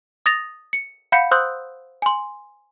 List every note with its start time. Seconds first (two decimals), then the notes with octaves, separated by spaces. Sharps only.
0.26 D#6 A6 A#6 F7
0.73 C#7
1.12 F5 F#5 B5 G6 C#7
1.31 C5 C6 D#6 E6 F#6 G6
2.02 G#5 C6